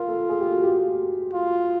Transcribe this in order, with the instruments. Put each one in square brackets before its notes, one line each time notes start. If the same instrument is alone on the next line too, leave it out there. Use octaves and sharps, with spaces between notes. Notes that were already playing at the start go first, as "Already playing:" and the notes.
Already playing: [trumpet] F4 [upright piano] A#4
[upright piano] A4
G#4
G4
F#4
G4
[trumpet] F4